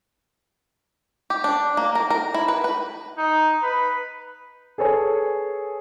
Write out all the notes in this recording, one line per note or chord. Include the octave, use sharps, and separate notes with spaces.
G4
D4
A#3
A#4
A#4
E4
B4
B4
D#4
B4
G#4 A4 B4 C#5 G#5